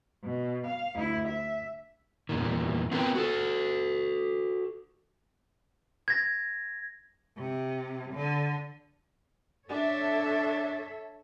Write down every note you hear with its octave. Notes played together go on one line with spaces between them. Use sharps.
B2
F5
D2 E4
E5
E2 A#2 D#3
B3 C4 F4 A#4 B4 G5
F#4 A4
G#6 A#6
C3
D3
D4 A4 C#5 E5